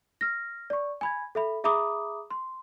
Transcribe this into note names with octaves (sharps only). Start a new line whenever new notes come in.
F6 A#6
D5 C#6
G#5 B5 G#6
A4 E5 B5
G#4 E5 A#5 B5 D6 D#6
C6